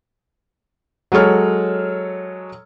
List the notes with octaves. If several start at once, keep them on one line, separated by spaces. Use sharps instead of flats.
F#3 G#3 A4 C#5 F6